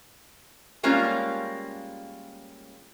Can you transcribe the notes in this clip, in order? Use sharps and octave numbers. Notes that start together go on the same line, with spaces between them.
G3 G#3 A#3 C#4 F4